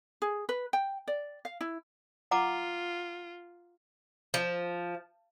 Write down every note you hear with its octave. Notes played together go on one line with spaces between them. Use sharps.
G#4
B4
G5
D5
F5
E4
F4 F#5 A#5 D6
F3